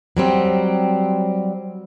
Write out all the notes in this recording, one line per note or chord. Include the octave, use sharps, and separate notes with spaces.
F#3 G3 C4